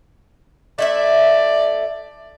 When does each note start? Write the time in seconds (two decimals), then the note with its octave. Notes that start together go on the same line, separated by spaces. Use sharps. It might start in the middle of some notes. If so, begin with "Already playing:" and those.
0.79 A3 E4 D5 E5